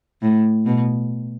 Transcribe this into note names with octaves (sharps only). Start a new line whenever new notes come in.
A2
B2